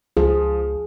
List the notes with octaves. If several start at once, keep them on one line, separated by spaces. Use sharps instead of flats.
C#2 F3 G#4